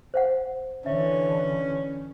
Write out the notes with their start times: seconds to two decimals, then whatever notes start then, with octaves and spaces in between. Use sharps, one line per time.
0.14 C5 F5 F#5
0.86 D3 E3 C#4 E5